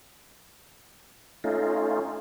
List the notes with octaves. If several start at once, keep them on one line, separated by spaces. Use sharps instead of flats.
A3 C#4 D#4 F4